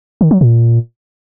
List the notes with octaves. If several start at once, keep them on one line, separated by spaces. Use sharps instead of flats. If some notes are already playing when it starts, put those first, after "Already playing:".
D#3
F#3
A#2